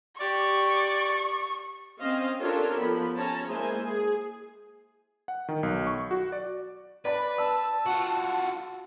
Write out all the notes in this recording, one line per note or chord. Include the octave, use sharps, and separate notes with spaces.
G4 D5 C#6
C4 C#4 C5 D#5 F5
D4 F4 G4 A4 A#4 C#5
F3 B3 B5
C#4 C#5 A5 A#5
G#3 A#3 E4 G#4 C5 G#5
G#4
F#5
D#3
B1
C#6
F#4
D5
B4 D5 B5
A5 E6
F4 F#4